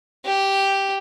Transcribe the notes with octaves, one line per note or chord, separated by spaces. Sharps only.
G4